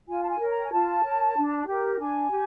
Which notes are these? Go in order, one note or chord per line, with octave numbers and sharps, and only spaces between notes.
F4 G#5
A5
G#5
A#4 C#5
A#5
G5
G#5
F4 A5
A#4 C#5
D4
G4 A#4
D4 G#5
G4